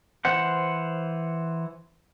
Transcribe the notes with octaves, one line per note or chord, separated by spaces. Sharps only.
E3 C5 F#5